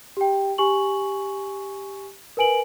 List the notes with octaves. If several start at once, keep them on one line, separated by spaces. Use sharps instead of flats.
G4 G5
G4 G#5 C#6 F#7
A#4 B4 G#5 D7 F#7